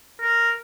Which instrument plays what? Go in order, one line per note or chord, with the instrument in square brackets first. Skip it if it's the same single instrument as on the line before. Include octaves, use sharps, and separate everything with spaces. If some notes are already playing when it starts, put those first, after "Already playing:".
[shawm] A#4